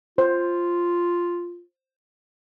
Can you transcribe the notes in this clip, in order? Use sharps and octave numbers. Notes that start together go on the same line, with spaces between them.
F4 C5